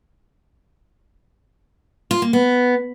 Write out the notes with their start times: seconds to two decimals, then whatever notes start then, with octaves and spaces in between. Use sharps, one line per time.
2.11 F4
2.22 A#3
2.33 B3